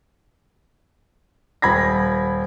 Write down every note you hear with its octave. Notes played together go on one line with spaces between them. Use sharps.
D#1 B5 G#6 A#6